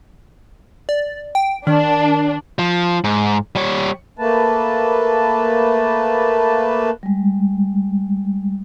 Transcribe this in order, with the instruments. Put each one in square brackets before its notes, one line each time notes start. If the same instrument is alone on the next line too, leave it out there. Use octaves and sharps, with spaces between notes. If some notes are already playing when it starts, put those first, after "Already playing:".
[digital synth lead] D5
G5
[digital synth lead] D#3 [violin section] D4
[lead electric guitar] F3
G#2
G3 C#5
[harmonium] A3 A#3 B4 A5
[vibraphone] G3 G#3